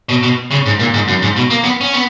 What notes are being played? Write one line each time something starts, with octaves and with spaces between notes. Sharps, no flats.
B2
B2
C#3
G#2
A#2
G#2
F#2
G#2
B2
A#3
B3
C#4
B3